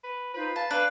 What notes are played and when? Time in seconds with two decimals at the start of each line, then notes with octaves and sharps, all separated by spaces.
0.04 B4
0.34 D#4 F4 B4 C5
0.56 F5 A5
0.71 D4 B4 F5